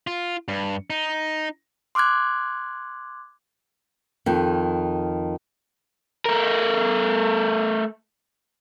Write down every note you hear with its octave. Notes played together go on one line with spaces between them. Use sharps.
F4
G2
D#4
C6 D6 F6 F#6 G#6
F2 D#3
A3 A#4